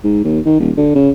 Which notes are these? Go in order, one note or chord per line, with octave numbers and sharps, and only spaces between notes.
G#2
D#2
D#3
D#1
D3
C#3